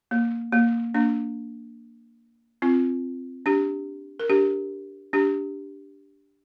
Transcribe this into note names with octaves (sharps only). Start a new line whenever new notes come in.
A#3
A#3
A#3 D4
C4 F4
D4 G4
A#4
D4 G4
D4 G4